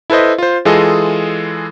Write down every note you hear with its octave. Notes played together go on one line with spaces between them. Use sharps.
E4 A4 B4 C5 D#5
F4 C5
E3 G#3 F4 G#4 A4 D#5